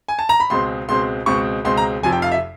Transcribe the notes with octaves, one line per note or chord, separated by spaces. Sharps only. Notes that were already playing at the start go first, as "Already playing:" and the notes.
G#5
A5
A#5
B5
C#2 B2 G#3 C4 C6
C#2 B2 G#3 C4 C6
C#2 B2 G#3 C4 C#6
C#2 B2 G#3 C4 C6
A#5
F1 F2 C3 F3 G#5
G5
F5
E5